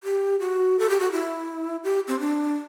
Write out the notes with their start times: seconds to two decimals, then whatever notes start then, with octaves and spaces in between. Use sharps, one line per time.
0.04 G4
0.40 F#4
0.79 A4
0.89 G4
1.00 F#4
1.12 E4
1.84 G4
2.08 C4
2.19 D4